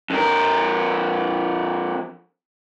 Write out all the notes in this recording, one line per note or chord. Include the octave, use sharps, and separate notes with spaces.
F2 A#4